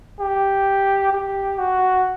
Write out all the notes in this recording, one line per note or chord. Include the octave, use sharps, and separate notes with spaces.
G4
G4
F#4